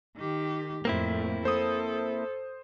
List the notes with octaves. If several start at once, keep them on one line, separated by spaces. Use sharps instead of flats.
D#3 G4
F2 A2 A#3 C4 E4
A4 C5 D#6